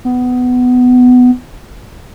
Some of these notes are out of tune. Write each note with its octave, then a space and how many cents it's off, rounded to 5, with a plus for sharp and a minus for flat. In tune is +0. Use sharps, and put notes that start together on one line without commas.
B3 +15